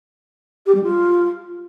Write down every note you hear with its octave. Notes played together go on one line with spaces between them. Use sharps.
G4
G3
F4